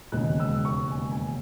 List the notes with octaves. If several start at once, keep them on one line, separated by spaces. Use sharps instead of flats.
E1 D#2 C#3 G#3 F#6
E6
C#6
G#5
G#5